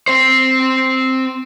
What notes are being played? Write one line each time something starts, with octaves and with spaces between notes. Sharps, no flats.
C4 C5